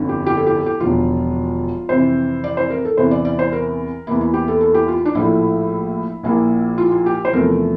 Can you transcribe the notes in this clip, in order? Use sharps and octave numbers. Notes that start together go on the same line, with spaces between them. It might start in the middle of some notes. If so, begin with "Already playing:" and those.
Already playing: G1 F2 D3
G4
G4
A4
G4
A4
G4
E1 E2 D3 F3 F4
F2 C3 E3 C5
D5
C5
A#4
A4
E2 C3 E3 C5
D5
D5
C5
A#4
E2 E3 A#3 E4
E4
G4
A4
A4
G4
F4
D4
A#1 A2 F3 A3 E4
A#1 A#2 F3 A#3 E4
F4
F4
G4
C5
E2 C3 F3 A3 A#4